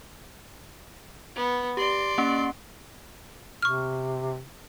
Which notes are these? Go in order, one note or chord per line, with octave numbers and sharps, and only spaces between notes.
B3
G4 D5 C6
A#3 C#4
C3 C#6 F6